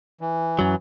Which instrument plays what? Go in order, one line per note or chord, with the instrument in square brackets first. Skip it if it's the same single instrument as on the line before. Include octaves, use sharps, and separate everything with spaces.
[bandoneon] E3
[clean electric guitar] F#2 F#3